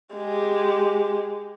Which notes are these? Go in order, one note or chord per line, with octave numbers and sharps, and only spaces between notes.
G#3 G4